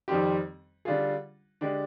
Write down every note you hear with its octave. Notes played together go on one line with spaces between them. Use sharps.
F2 D#3 G3 C4 G4
D3 G3 D4 F4 G#4
D3 G#3 D4 G4